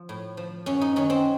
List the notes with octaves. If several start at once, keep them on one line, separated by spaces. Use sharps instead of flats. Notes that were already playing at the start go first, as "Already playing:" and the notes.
Already playing: F3
A2
F3
F#2 C#4
D#4
D#3 F#3 C#4
C4